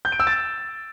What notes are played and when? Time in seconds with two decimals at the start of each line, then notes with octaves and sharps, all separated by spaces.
0.05 G6
0.12 D7
0.20 E6
0.27 A6